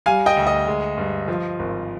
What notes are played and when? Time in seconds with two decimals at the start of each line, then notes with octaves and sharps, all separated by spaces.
0.06 G3 F5 G#5
0.26 D#5 G5
0.37 D2
0.47 D#5
0.68 G#3
0.97 G2
1.28 F3
1.59 G#1